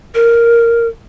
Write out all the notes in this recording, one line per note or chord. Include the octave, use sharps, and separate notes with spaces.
A#4